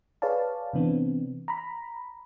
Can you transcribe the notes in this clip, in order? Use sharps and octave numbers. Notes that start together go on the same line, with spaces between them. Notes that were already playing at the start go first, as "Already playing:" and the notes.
G#4 B4 C#5 D5 F5 A5
C3 E3 B3 C4 D4
A#5 B5